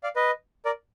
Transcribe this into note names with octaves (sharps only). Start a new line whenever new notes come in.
D5 F5
B4 D#5
A#4 D5